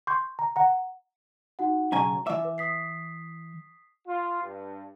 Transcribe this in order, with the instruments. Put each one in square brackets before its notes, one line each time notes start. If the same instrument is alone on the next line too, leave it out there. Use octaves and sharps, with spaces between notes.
[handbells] C6 C#6 G6
A#5
F#5 A#5
[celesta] D#4 F#4 F#5
[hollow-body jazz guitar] B1 C#3 G#5 [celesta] A#5 C#6
[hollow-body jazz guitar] E3 E5 [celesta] D6
[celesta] B4
D#6 B6 C7
[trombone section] F4
G2